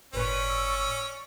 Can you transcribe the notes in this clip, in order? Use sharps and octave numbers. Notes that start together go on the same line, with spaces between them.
G1 A2 C#4 B4 D5 C#6
E6